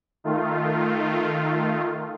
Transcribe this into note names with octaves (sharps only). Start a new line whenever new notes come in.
D#3 A3 F4